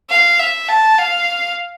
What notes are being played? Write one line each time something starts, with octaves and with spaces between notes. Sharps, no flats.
F5
E5
A5
F5